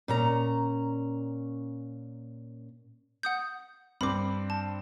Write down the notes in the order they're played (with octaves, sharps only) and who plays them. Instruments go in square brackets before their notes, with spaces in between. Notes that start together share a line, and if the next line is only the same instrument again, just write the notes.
[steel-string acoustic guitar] A#2 C#4 A#5
[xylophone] F#5 D#6 G6
[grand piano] G2 C4 [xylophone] B5 D6
[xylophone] A5